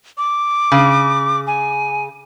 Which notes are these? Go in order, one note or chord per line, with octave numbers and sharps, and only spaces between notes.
D6
C#3
G#5